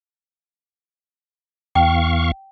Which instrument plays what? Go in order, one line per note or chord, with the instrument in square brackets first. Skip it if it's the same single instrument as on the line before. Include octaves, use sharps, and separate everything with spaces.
[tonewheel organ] E2 F5 C#6 [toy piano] G5